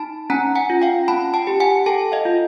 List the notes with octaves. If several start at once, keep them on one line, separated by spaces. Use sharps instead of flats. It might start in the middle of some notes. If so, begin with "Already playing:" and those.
Already playing: D#4 A5 B5
C#4 G#5 A#5
F#5 G#5
F4
F5 G5
C#4 A5 B5
G5 A5
G4
F#5 G#5
A4 G5 A5
D#5 F5
F4